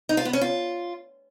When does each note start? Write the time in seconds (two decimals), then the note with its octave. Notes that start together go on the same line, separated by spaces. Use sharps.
0.09 D#4
0.17 F4
0.25 B3
0.33 C#4
0.41 F4